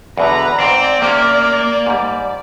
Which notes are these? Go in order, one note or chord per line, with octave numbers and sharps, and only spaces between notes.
E2 B2 D3 B4 A#5
G#2 C4 C5 D5
C3 A#3 C#4
G#2 G3